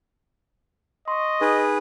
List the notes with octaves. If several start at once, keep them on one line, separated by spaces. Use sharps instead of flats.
D#5 C6 C#6
D#4 G#4 B4